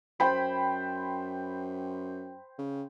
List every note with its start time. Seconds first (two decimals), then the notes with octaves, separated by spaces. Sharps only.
0.20 F#2 C5 G5 B5
2.58 C#3